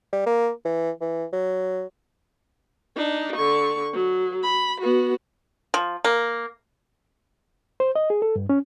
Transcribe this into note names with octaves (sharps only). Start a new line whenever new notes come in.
G3
A#3
E3
E3
F#3
D4 D#4
D3 C#6
F#3
B5
B3 F#4
F3
A#3
C5
D#5
G#4
A4
G2
C#4